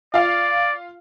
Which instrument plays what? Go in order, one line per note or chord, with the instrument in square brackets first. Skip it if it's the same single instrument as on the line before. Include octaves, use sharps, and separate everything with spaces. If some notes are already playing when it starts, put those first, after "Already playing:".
[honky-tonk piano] F4 F5 [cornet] D5